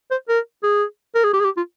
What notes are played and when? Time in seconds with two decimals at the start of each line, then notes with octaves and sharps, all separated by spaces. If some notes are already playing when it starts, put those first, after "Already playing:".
0.11 C5
0.28 A#4
0.63 G#4
1.15 A#4
1.24 G#4
1.33 G4
1.40 G#4
1.45 G4
1.57 F4